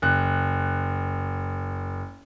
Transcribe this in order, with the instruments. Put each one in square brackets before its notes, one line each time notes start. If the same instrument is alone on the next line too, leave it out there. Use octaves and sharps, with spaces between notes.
[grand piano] F#1 F#6